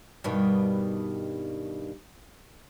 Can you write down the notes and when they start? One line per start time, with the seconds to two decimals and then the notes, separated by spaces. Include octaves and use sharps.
0.24 G2 B2 D#3